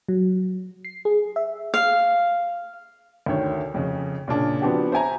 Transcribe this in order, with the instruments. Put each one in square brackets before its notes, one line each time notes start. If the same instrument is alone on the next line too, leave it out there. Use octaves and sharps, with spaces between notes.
[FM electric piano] F#3
C7
G#4
E5
[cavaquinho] F5
[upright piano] D2 D#3 C#5
F2 C#3
A#2 C#3 D4
F3 B3 C4 D4 F#4 G4
C5 E5 G#5 A#5